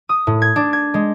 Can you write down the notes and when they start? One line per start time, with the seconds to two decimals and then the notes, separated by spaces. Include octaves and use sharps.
0.09 D#6
0.27 A2
0.42 G#6
0.56 D4
0.73 G#6
0.94 G#3